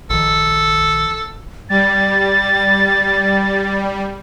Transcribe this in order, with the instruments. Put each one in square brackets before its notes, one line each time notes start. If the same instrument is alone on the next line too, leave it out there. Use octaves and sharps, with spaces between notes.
[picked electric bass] A#1 D#3 [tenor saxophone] A4
[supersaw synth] G3 [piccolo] A6